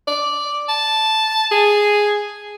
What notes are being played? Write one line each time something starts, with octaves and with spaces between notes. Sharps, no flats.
D5
A5
G#4